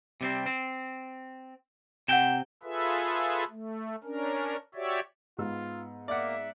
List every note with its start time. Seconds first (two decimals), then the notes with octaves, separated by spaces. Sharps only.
0.21 C3 G3 C4
0.46 C4
2.08 C3 F#5 G5 G6 E7
2.63 F4 G#4 A4 B4 E5
3.49 A3
4.04 C#4 D4 A#4
4.75 F#4 G4 C#5 D5 E5
5.38 G#2 B3 F4 E6
6.08 A#3 D5 E5 F#5